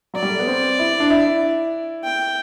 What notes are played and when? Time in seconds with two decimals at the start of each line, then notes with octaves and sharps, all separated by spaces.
0.14 F#3 D5
0.23 G3
0.30 A3
0.39 B3
0.47 C4
0.79 E4
1.00 D4
1.10 E4
2.04 G5